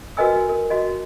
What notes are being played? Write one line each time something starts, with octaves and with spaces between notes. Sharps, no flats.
F#4 A#4 B4 D#5 G#5 E6
A#4
F#4 D#5